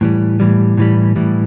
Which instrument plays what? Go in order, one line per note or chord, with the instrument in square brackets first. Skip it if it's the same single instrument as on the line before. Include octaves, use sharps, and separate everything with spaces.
[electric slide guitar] A2 E3 G3
A2 E3 G3
A2 E3 G3
A2 E3 G3